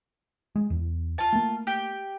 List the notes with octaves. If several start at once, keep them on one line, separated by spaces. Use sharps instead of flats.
G#3
E2
F4 A5
A3 A#3
G4